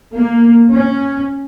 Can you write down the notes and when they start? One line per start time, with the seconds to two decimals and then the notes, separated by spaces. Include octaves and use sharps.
0.16 A#3
0.69 C#4